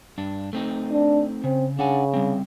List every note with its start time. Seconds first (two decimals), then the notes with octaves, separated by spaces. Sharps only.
0.18 G2 D4
0.53 A3 C4 D#4
0.92 D4
1.44 C#3 C4
1.79 C#3 D4 F#5 G#5
2.14 G3 C4